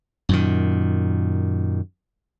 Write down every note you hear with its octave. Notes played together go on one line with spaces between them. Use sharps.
F#2 A#2 D#3